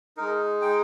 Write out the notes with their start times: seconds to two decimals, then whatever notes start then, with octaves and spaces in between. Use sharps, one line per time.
0.17 G#3 D#4 A#4
0.62 G5